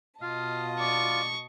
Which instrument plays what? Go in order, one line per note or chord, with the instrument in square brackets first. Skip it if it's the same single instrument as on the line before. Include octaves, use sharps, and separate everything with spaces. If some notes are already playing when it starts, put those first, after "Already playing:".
[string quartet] B2 D#5 A5 [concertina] F4 [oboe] F5
[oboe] D5 [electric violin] C#6